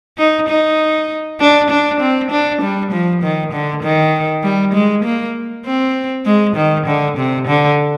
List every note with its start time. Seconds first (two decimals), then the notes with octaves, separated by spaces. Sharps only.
0.18 D#4
0.48 D#4
1.40 D4
1.70 D4
2.00 C4
2.31 D4
2.62 G3
2.92 F3
3.22 D#3
3.53 D3
3.83 D#3
4.43 G3
4.73 G#3
5.04 A#3
5.65 C4
6.26 G#3
6.56 D#3
6.87 D3
7.17 C3
7.47 D3